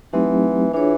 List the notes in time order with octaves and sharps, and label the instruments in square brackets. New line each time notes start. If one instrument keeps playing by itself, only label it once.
[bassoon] E3 [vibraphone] F#3 A3 C4 D#4 G4
[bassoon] E3 [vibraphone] D4 F4 G#4 C#5